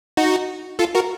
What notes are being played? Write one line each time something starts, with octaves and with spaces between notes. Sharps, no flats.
D#4 F#4
F4 A4
F#4 A#4